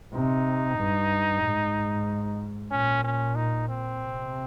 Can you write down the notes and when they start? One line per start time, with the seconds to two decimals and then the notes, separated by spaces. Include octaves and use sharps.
0.13 C3 D#4
0.78 G2
1.42 G#2
2.71 A#2 C#4
3.04 C#4
3.35 D#4
3.69 C4
4.01 C3